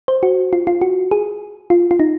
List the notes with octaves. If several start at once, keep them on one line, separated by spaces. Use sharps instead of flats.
C5
F#4
F4
F4
F#4
G#4
F4
F4
D#4